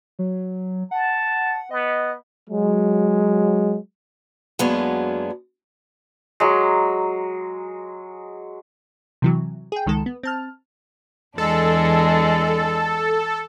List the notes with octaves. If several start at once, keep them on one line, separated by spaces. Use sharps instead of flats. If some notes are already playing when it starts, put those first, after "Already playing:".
F#3
F#5 A5
B3 D#5
F#3 G#3
F#2 F#3 G#3 A#3 B3 D4
F#3 G#3
C3 E3 F#3
G#4 G5
C#2 D#3 G#3 A4
B3
C4 A5 F6
E2 G#3 D4 A4